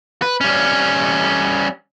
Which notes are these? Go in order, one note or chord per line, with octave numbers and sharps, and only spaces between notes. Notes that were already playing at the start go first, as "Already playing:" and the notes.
B4
G3 C#4